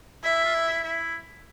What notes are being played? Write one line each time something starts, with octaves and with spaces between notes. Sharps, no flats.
E4 E5
F4
E4
E4